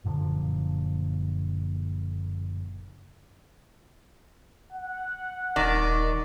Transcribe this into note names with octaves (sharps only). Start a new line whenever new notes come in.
F#1 A#2 D3 F3
F#5
D#1 D#3 D5